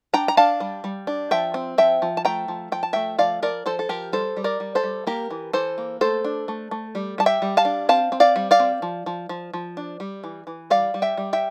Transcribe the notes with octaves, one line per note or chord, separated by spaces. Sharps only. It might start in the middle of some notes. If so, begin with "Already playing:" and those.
D4 G5 A#5
A#5
D4 F5 A5
G3
G3
D4
F3 E5 G5
C4
F3 E5 G5
F3
A5
A3 G5 A#5
F3
F3 G5
A5
A3 E5 G5
F3 D5 F5
F3 A#4 D5
F3 A4 C5
A4
F3 G4 A#4
G3 A4 C5
G3
A#4 D5
G3
A4 C5
G3
A#3 G4 A#4
E3
E3 A4 C5
A#3
A3 A4 C5
D4
A3
A3
G3
G3 A5
E5 G5
G3
F5 A5
D4
C4 F5 A5
C4
D5 F5
G3
D5 F5
C4
F3
F3
F3
F3
D4
G3
E3
E3
G3 D5 F5
G3
E5 G5
G3
E5 G5